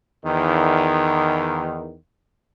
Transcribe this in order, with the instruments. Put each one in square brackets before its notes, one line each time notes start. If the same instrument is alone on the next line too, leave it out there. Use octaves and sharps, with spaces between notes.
[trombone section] E2 D#3